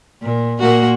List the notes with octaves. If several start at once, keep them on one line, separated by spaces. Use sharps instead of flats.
A#2
A#2 A#3 F#4